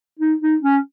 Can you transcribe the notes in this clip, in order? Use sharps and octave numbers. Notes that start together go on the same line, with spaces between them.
D#4
D#4
C#4